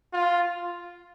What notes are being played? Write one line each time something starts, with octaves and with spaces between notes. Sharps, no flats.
F4